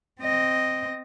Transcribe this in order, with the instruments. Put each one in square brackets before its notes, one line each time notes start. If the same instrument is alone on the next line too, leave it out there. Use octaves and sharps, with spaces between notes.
[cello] C4 D#5